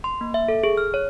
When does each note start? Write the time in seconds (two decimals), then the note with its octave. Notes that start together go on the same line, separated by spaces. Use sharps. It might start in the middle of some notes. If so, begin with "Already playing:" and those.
0.04 C6
0.21 A#3
0.34 E5
0.48 A4
0.63 G#4
0.77 F6
0.94 C#5